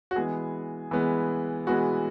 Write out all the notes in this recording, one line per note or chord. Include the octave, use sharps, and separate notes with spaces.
F#4
E3 G#3 B3 G#4
E3 G#3 B3
E3 G#3 B3 F#4